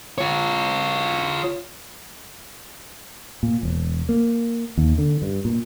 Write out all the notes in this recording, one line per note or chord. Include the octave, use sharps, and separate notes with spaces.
F4 C#5
A#2
E1
A#3
D#2
D3
G2
A#2